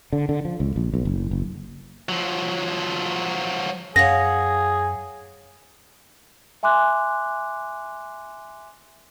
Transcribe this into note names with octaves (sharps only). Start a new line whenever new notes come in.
D3
D3
F3
C#2
A#1
B1
F#1
F#1
F3 F#3
F#2 G#4 C#5 F5 F#5 A#6
E5 G#5 C6 D6 F#6